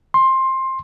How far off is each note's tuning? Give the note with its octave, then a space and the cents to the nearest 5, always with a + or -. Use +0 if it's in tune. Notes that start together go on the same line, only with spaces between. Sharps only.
C6 +15